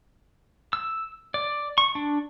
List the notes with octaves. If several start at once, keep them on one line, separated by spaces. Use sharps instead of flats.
E6
D5
C#6
D4